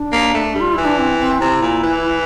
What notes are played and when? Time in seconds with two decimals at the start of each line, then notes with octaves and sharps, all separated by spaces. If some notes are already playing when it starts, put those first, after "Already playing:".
Already playing: D4
0.13 A#3
0.34 A3
0.55 G3
0.60 F4
0.73 E3 E4
0.85 D4
0.99 C4
1.19 C4
1.41 C3 E4
1.62 A#2
1.83 E3